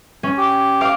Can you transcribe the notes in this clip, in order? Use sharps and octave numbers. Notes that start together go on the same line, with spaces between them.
C#4
G4
F5 D6